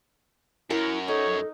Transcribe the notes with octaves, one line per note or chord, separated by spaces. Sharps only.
F#2 E4 A#4 C#5 F#5
D#4 A4 C#5